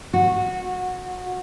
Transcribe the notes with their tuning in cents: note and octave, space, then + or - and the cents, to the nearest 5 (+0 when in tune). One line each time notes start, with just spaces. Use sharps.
F#4 -20